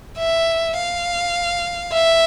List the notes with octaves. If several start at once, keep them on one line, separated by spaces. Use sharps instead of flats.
E5
F5
E5